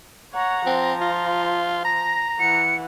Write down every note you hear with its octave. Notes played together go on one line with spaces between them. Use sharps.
C#5 F#5 A#5
F3 C4
F4
A#5 A#6
E3 F#5 C#7